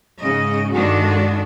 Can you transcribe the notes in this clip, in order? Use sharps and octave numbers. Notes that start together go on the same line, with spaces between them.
G#2 C#3 D#5
G2 D3 D#3 G#3 D4 F#4